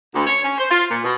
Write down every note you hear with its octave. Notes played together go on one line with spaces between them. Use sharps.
D2
C#5
C#4
C5
F4
A#2
B2